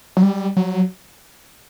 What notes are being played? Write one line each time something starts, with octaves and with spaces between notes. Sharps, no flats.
F#3
G3
F#3